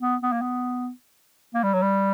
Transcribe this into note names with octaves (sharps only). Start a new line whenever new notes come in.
B3
B3
A#3
B3
A#3
G3
F#3
G3